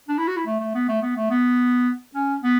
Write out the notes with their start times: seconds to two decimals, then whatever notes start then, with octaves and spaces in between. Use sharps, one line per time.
0.08 D4
0.18 E4
0.27 F#4
0.37 E4
0.46 A3
0.60 A3
0.75 B3
0.89 A3
1.02 B3
1.16 A3
1.30 B3
2.15 C#4
2.43 B3